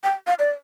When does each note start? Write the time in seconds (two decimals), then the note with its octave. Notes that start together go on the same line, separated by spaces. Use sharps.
0.04 G5
0.27 F5
0.39 D5